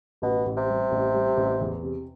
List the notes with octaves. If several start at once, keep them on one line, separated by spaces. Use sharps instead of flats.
A1 B2
A1
C3
G3
A1
G3
A1
E2
C3